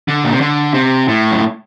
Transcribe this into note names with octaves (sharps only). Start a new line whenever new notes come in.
D3
A#2
C3
D3
C3
A2
F#2